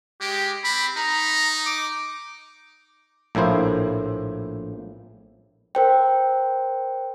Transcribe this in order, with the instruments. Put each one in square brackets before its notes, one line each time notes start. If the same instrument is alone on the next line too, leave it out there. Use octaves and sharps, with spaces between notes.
[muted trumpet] G#3 [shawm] G4
[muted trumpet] C4 [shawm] B5
[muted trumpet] D#4 [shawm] A#5
[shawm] D6
[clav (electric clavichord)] A#1 A2 A#3 E4 C5
[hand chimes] A#4 C5 G5